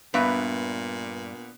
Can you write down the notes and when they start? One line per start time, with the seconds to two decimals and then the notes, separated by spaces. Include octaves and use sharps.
0.14 G2 A#2 B3 B4 E5